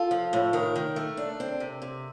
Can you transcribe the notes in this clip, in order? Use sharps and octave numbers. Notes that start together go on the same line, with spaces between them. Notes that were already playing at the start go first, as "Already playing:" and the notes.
Already playing: F4 A4
F3
A2
D#3 A#4
D#3
A3
D4
C4
C3
C3